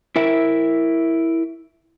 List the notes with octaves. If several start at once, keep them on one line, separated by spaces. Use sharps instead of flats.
E4 A#4 E5